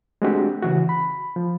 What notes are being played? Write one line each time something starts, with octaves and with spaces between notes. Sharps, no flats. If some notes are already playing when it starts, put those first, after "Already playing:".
G#3 A3 C4 D4 F#4 G4
C#3 E3 F#4
B5
F3